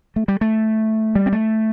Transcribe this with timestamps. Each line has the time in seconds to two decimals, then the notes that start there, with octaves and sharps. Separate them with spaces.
0.16 A3
0.28 G3
0.41 A3
1.15 G3
1.26 C4
1.32 A3